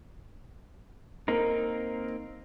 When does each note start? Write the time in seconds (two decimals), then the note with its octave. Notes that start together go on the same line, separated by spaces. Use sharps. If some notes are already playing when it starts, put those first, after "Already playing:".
1.28 A#3 C4 D#4 A#4